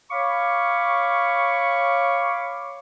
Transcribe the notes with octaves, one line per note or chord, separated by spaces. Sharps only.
C#5 F5 B5 C#6 D6